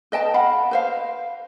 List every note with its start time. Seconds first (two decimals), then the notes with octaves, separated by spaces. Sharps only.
0.12 B4 D#5 G5 A5
0.34 F5 F#5 B5
0.71 B4 C5 F5